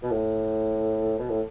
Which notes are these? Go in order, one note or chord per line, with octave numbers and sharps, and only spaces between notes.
B2
A2
B2
A2